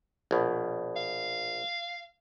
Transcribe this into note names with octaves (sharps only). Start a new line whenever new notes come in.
A#1 B2
F5